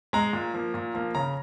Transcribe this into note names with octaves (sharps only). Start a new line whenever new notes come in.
G#3 A#5
A#2
F3 A#3
A#2
F3 A#3
C#3 A#5